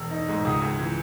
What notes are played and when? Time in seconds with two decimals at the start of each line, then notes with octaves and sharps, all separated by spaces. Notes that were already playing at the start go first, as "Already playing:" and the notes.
Already playing: E1 E6
0.11 D#4
0.28 G#2
0.45 C#2 D#6
0.62 C#2
0.79 E3